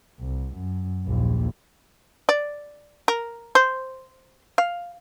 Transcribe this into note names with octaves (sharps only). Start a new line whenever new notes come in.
C2
F#2
A#1 D#2
D5
A#4
C5
F5